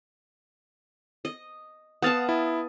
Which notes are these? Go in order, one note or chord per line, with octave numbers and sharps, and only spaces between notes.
D#5
B3 F5 F#5 A5 D#6 A6
E4